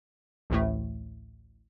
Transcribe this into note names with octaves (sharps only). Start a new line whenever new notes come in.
A1 D2 A2 A3